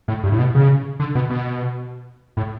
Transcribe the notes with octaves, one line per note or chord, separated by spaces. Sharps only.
A2
G2
A2
B2
C#3
D3
B2
B2
A2